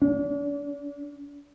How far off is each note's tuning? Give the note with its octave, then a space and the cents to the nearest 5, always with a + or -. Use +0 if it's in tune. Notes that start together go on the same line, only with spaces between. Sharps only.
D4 -40